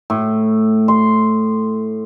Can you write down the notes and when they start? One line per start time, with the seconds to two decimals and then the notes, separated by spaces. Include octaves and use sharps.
0.10 A2
0.88 C6